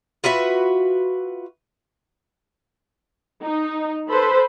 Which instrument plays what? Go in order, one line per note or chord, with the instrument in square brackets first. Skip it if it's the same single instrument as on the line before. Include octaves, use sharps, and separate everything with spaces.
[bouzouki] F4 F#4 B4 E5
[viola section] D#4
A4 B4 C5 B5